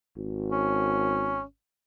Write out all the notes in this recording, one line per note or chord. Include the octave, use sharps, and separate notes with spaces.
G#1
C#4